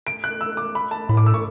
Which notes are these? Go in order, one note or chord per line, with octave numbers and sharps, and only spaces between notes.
D7
F#6
E6
D6
B5
A5
A2 B5
D6
E6
C#6